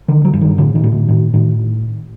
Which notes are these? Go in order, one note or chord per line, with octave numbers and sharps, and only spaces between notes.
D3 D#3
F#3
G2
D#3
A2 D3
D#3
A2
D3
A2 D#3
A2 D#3